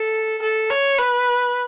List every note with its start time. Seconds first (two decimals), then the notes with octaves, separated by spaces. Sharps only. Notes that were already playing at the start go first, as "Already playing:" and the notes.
Already playing: A4
0.42 A4
0.70 C#5
0.98 B4